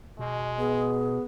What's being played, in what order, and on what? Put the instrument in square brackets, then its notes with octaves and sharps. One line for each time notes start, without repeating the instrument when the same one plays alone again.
[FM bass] B2 [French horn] G#3
[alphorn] B3 [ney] G#4